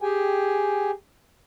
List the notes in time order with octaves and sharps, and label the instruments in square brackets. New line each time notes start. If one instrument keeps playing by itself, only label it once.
[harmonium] G4 G#4 G5 G#5